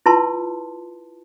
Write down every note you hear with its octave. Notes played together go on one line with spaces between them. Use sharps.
E4 F4 B4 A5 C6